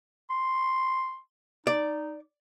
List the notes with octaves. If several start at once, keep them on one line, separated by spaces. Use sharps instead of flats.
C6
D#4 D5